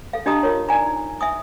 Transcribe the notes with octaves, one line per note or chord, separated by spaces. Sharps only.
A4 F5
D4 G4 D#5 A5 A#5 D#6
F4 A#4 C#5
D#4 D5 G#5 A#5
E5 G#5 D#6